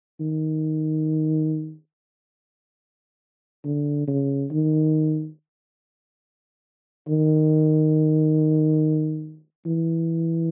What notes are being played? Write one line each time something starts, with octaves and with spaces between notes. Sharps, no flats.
D#3
D3
C#3
D#3
D#3
E3